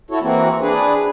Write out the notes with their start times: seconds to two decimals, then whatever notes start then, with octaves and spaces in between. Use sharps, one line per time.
0.11 E4 F#4 A4 C#5
0.22 E3 A#3 C4 F#4
0.61 D4 G#4 B4